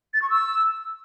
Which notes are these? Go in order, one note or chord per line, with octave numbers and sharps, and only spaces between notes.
A6
C#6
E6